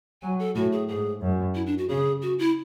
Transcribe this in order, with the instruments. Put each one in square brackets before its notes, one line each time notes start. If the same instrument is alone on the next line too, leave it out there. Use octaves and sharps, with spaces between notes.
[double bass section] F#3 [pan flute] G#5
[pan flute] A4
[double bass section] A2 [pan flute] F#4
[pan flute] G#4
[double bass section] G#2 [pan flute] G#4
[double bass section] F#2
[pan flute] E4
D4
F#4
[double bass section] C#3 [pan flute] G#4
[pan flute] F#4
E4